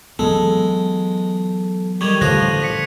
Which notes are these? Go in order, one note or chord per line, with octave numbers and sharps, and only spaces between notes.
E3 F#3 G#3 B3 A4
D#3 G3 C#6 G#6 F7
A1 D3 F3 F4 F#6 A#6 D#7
B6 C#7